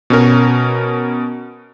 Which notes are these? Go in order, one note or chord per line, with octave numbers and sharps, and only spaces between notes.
B2 C#4 A#4